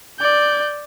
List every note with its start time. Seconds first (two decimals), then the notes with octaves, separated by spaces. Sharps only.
0.20 D5 G6